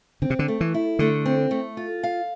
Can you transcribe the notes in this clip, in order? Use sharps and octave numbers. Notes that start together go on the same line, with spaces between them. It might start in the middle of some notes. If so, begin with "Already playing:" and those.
D3 C4
C3
D3
A3
E3
E4
D3 A3
C4
A3
F4
F5